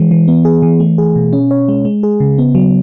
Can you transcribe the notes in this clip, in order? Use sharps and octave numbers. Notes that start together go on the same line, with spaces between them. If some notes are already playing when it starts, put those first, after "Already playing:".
Already playing: E3 G#3
E3
B3
G#4
E3
A3
G#4
B2
C#4
C#5
G#3
G#3
G#4
C#3
B3
F#3